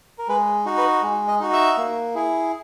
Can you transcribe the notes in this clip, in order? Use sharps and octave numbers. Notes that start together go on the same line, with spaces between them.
A#4
G#3 B4
D#4 F#4
B4
G#3
D#5
D#4 F#4
E5
A#3
E4 G#4